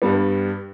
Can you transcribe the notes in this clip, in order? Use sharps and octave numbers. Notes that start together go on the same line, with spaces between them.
G2 G3 B3